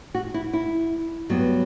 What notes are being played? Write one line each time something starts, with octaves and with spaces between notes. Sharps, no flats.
F#4
E4
E4
G2 F#3 B3